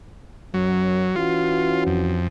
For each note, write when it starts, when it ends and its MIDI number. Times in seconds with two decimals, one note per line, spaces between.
0.54 1.07 42
0.54 1.16 54
1.16 2.24 52
1.16 2.24 61
1.16 1.84 65
1.16 2.24 66
1.87 2.28 41